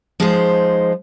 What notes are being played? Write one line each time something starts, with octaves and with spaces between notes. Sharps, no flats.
F3 G#3 D#4 C5